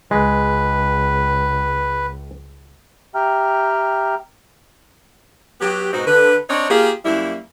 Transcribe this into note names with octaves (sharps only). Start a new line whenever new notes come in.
C#2 G#3 B4
G4 E5 G5 A#5 F6
F#3 B3 G4
G#2 B2 C4 D#4 F#4
D3 B4
C4 D4 D#4 C#5
A#3 F4 G4 G#4
F#2 G3 A#3 E4